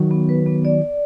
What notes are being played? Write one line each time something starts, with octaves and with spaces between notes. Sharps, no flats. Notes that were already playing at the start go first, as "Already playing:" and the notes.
Already playing: D#3 F#3
B3
B4
B3
D5
D5